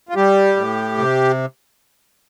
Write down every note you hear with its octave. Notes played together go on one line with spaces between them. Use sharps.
F4
G3 G4
A2
C3